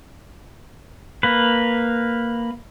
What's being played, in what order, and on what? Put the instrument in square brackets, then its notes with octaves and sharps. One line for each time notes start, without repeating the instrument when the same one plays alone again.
[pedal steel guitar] A#3 B4